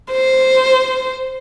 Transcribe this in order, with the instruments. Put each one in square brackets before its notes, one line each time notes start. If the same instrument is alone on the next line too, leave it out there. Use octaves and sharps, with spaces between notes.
[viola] C5